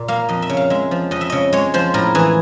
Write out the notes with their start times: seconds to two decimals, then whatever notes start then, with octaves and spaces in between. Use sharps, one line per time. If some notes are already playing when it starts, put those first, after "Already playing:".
Already playing: A#2
0.08 A#3 F5
0.29 F2 D#5
0.42 E5
0.49 C#3
0.57 F5
0.70 G#3 E5
0.91 F3
1.11 F2 D#5
1.21 E5
1.30 C#3 D#5
1.53 G#3 C#5
1.74 F3 C5
1.94 A2 A#4
2.15 E3 G#4